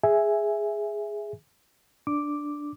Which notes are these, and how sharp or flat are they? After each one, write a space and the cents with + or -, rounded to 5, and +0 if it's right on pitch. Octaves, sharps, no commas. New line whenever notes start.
G#4 +0 E5 +0 G#5 +0
D4 +0 D6 +0